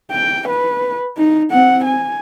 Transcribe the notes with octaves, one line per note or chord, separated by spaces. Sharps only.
G5
B4
D#4
C4 F#5
G#5